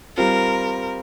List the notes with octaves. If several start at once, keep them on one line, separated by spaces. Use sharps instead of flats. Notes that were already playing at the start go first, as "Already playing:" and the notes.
G3 C4 F4 A#4